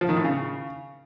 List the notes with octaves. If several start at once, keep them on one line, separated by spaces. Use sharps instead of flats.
F3
D#3
A2
C#3